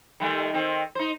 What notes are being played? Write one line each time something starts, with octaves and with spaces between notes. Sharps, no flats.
D#3 G3 A3
D#3 C4
D#4 C5